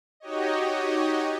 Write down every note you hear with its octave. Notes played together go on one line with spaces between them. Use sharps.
D#4 F#4 G4 C#5 D#5